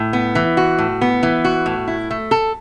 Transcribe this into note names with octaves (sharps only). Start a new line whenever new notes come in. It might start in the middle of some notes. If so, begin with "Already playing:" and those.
Already playing: A2
B3
E3
F#4
A2
B3
E3
F#4
A2
E4
A3
A4